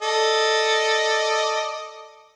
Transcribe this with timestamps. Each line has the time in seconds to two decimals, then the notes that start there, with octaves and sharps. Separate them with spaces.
0.02 A4 D5 D#5